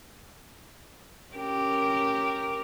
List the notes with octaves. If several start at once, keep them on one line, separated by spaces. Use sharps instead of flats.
C#4 G4 A#4